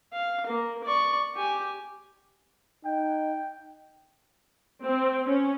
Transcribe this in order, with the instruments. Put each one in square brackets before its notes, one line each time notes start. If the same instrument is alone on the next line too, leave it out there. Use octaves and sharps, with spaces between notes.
[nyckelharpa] F5
A#3
D5 C#6
G4 G#5
[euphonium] D#4 [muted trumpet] G5
[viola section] C4
C#4